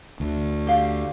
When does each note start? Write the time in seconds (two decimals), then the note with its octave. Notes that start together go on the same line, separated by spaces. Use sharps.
0.20 D2
0.67 G4 F5